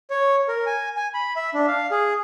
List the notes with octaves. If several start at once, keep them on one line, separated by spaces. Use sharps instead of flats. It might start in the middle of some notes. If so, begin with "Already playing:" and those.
C#5
A#4
G#5
G#5
B5
E5
D4
F5
G#4